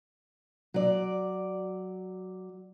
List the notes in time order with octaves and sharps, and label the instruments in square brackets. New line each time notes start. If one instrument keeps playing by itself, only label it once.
[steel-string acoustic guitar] F#3 D5